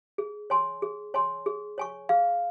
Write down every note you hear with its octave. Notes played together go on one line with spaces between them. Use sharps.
G#4
C#5 G#5 C6
G#4
C#5 G#5 C6
G#4
C#5 G#5 C#6
G#4 F5